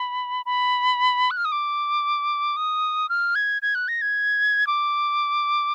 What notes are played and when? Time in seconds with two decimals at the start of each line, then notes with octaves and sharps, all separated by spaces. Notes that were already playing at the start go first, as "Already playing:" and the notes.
Already playing: B5
0.46 B5
1.31 F#6
1.37 F6
1.45 D#6
1.52 D6
2.57 D#6
3.09 F6
3.35 G#6
3.62 G#6
3.75 F#6
3.88 A#6
4.01 G#6
4.67 D6